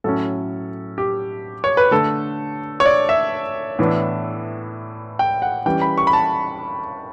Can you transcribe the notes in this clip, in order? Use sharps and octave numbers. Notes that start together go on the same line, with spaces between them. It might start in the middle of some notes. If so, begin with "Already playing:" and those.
A2 F#3 C#4 A4
G4
C#5
B4
D3 A3 D4 A4
C#5
D5
E5
A2 E3 B3 D4
G5
F#5
E3 G3 C#4 G5
B5
C#6
B5
A5